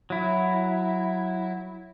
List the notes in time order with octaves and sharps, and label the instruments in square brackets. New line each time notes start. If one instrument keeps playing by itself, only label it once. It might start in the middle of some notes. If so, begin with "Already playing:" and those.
[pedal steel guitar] F#3 E4